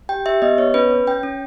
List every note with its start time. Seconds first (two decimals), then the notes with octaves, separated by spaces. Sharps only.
0.09 G4 G5
0.26 G4 E5
0.42 B3 D#5
0.58 B3 C#5
0.74 C#4 B4
0.91 C#4
1.07 C#4 G5
1.23 C#4